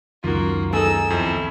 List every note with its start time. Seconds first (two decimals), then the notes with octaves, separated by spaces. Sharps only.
0.24 C#2 F#2 D#3 A#3 F4 F#4
0.73 B3 D#4 G#4 A4 E6
1.10 F2 E4